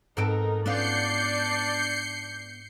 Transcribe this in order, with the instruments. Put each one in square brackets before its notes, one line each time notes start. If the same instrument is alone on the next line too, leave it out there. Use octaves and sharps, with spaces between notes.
[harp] G#2 D7 [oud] B3 C4 A4 [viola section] D#4 A#4
[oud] B3 C#4 F4 [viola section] D4 D5 [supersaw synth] G6 C7 C#7